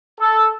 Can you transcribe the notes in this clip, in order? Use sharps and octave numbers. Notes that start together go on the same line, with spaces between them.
A4